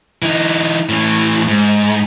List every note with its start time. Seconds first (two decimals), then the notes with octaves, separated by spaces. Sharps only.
0.22 E3 D#4
0.89 A2 E3
1.48 G#2